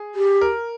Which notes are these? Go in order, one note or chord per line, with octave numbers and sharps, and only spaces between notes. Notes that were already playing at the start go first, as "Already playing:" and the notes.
Already playing: G#4
G4
A#4